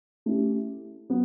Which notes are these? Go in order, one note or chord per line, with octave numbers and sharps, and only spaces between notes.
A3 C#4 E4 G4
F#3 B3